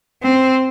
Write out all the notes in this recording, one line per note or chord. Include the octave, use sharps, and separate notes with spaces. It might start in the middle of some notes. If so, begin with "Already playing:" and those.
C4